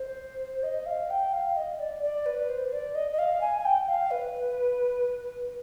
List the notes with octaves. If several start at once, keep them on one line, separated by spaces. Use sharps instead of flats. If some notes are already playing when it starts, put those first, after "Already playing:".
Already playing: C5
D#5
F5
G5
F5
D#5
D5
D5
B4
C5
D5
D#5
D#5
F5
G#5
G#5
G5
F5
B4